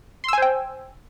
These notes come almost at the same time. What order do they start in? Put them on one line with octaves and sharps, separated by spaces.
C6 E6 G#5 C5 G5